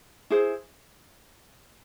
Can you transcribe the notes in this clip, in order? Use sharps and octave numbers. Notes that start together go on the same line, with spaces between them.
E4 G#4 C5